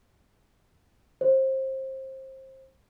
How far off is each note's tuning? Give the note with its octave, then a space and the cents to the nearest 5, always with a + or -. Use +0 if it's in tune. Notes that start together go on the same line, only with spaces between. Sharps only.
C5 +25